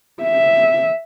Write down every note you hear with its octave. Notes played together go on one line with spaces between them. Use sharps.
E5